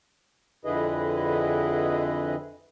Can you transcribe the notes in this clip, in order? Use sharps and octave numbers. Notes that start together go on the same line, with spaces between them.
F2 D3 E4 G#4 B4 D#5